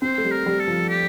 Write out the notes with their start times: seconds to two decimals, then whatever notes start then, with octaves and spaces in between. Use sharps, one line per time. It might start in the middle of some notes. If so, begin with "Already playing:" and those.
0.02 C4 C5
0.18 A3
0.24 G3
0.31 A#4
0.46 G3
0.60 A4
0.68 F3
0.89 G4